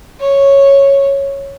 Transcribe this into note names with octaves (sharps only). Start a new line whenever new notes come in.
C#5